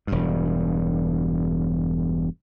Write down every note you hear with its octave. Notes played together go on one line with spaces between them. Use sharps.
E1 G2